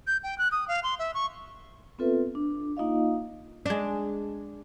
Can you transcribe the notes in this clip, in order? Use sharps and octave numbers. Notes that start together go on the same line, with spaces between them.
G6
G5
F#6
D#6
F5
C6
E5
C#6
B3 C4 F4 A4 B4 E5
D4
A#3 D#4 F4 D#5 F5
G#3 D4